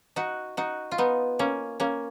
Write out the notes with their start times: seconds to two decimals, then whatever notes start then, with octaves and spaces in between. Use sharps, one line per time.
0.16 D#4 F#4
0.57 D#4 F#4
0.91 F4
0.98 B3 D#4
1.39 A#3 C#4
1.80 A#3 C#4